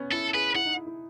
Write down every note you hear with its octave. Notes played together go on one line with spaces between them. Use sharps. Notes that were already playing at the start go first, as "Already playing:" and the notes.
Already playing: B3 C#4
E4 A4
G#4 B4
E4 F#5
D#4
E4
E4